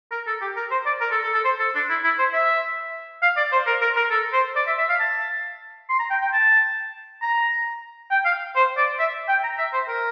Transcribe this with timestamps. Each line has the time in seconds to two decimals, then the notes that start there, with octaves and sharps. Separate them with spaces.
0.11 A#4
0.27 A4
0.42 G4
0.56 A#4
0.71 C5
0.86 D5
1.01 A#4
1.11 A4
1.23 A4
1.34 A4
1.45 C5
1.59 A4
1.75 D4
1.89 E4
2.04 E4
2.19 C5
2.33 E5
3.23 F5
3.37 D5
3.52 C5
3.67 A#4
3.81 A#4
3.96 A#4
4.11 A4
4.33 C5
4.56 D5
4.67 E5
4.78 E5
4.89 F5
5.00 A5
5.89 C6
5.99 A#5
6.10 G5
6.22 G5
6.33 A5
7.22 A#5
8.11 G5
8.25 F5
8.56 C5
8.77 D5
8.99 E5
9.29 G5
9.44 A#5
9.58 E5
9.73 C5
9.88 A#4